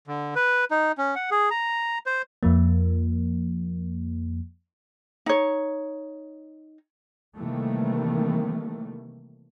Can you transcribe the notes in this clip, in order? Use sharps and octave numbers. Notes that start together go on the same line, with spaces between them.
D3
B4
D#4
C#4
F#5
G#4
A#5
C5
F2 F3 A#3
D#4 C#5
C3 D#3 E3 G3 A3 A#3